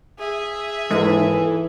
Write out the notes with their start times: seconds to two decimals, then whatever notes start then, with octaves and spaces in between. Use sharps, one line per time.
0.19 G#4 E5
0.91 D#2 G#2 E3 A4 G#5